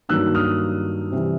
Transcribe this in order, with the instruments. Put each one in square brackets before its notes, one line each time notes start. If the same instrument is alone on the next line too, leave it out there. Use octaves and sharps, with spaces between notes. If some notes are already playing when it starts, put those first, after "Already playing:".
[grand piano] G2 D#3 F#3 A#3 D#4 E6 F#6
D#6 F6
C3 E3 G3